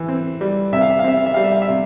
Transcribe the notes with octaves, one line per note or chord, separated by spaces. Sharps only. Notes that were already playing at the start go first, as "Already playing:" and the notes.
Already playing: E3
C4
G3
C3 E5
F5
E5
F5
C4 E5
F5
E5
G3 F5
E5
F5
E5
C3